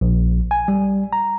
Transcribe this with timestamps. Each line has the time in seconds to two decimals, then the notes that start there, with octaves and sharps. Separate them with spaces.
0.01 A#1
0.51 G#5
0.68 G3
1.13 A#5